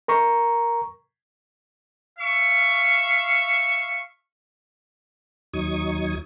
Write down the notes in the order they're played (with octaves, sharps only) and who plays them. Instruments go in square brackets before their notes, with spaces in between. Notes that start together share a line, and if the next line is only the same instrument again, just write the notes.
[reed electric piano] A#4 A#5 C#6
[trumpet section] E5 F5 C#6
[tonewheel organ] D#2 F#3 D#4 C#6 D#6 G#6